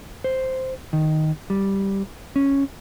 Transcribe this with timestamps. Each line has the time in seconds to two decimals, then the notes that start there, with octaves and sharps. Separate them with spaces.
0.24 C5
0.93 D#3
1.50 G3
2.36 C#4